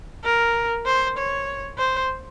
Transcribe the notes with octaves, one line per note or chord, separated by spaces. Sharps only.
A#4
C5
C#5
C5